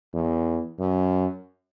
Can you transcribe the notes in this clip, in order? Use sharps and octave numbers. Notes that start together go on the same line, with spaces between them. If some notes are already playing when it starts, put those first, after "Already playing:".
E2
F#2